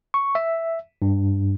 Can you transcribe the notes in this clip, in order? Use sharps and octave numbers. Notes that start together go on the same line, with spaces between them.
C#6
E5
G2